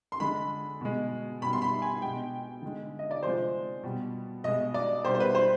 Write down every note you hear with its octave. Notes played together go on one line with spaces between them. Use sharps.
C6
D3 G#3 B5
B2 G#3
B2 G3 B5
C6
B5
G#5
B2 G#3 G5
D3 G#3
D#5
D5
C3 F3 G#3 C5
B2 G3
B2 G#3 D#5
D5
B2 G3 C5
C5
B4
C5